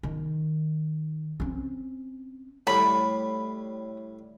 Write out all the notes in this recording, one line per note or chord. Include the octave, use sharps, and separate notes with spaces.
D#3
C4 C#4
A2 G3 B5